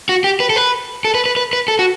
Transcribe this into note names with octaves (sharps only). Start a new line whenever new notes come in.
F#4
G4
B4
A4
B4
A4
B4
B4
B4
B4
A4
F#4